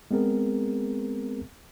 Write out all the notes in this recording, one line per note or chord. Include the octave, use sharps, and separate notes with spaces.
G#3 B3 C4 G#4 A#4